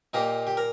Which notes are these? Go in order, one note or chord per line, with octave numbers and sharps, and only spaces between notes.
A#2 A#3 D#4 G4
G4
A#4